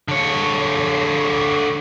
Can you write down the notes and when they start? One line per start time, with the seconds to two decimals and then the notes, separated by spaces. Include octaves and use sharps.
0.08 D3 C#5